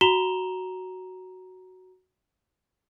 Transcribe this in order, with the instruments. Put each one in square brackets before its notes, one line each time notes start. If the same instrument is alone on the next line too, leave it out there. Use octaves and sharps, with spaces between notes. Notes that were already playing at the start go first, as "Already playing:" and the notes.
[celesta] F#4 A#5 E7 F7 G7